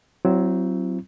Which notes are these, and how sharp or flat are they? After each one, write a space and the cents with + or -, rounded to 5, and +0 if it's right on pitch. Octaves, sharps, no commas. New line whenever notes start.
F#3 +20 C4 +0 E4 +40